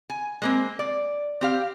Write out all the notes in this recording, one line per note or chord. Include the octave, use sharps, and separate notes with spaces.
G#5
G#3 A#3 C4
D5
C4 G4 F5